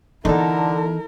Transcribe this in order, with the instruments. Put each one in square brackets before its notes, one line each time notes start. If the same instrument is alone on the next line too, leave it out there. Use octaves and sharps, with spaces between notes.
[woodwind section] D3 [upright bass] E3 B3 [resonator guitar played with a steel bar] D#4 A4 [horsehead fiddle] E4 A#4